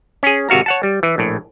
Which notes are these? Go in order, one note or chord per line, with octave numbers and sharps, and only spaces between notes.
C#4 G#4
G#1 C3 F#4 F5 A#5
C#5 F#5 A5
G3
E3
A#1 A2